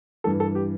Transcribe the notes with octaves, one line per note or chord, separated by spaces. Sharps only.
G2 E3 A4
A4
G4